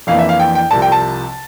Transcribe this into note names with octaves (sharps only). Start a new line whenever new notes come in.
F2 E3 A#3 D4 F5
E5
F5
G5
G5
C2 C3 F3 A5
G5
A5